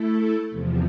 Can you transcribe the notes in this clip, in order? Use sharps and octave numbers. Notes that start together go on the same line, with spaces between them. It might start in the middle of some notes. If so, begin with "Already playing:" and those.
Already playing: A3 E4 A4
E2 C3 F3